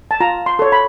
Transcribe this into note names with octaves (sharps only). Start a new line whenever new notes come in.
A5
F4 A#5
C6
A4 C#5
B5